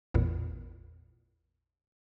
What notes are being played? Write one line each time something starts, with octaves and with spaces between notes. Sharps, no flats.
A1 E2 A#2